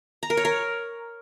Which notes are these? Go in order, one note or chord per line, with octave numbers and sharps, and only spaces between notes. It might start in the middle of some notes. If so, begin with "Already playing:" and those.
A#5
A#4
C#5
A#4